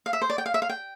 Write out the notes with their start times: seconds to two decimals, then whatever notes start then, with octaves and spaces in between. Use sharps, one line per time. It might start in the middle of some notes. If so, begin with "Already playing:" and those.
0.06 F5
0.13 E5
0.22 C5
0.30 D5
0.38 G5
0.46 F5
0.54 E5
0.62 F5
0.70 G5